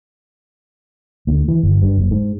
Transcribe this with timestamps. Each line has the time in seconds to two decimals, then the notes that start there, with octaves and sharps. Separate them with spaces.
1.27 D2
1.48 E3
1.63 G1
1.82 G2
1.97 F#1
2.11 G#2